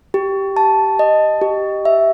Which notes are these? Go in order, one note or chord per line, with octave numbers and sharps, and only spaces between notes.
G4
A5
D#5
G4
E5